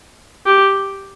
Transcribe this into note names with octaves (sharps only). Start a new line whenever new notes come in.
G4